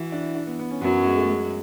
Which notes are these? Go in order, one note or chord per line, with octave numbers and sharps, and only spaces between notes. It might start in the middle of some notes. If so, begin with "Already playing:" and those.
Already playing: E3 E4 F#4
D4
D4
B3
B3
C#4
F#2 F#3 B3
G#3
A3
G#3